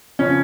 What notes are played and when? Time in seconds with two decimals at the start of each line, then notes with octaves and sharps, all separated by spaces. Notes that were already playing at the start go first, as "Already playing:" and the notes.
0.19 C#3 F3 C#4